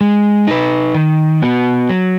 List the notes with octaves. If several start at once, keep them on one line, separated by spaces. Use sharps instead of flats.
G#3
D#4 B4
D#3
B3 F#4
F#3